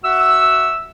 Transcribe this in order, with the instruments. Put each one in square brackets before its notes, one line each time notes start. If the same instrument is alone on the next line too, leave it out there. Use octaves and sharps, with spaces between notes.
[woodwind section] F#4 E5 F#5 E6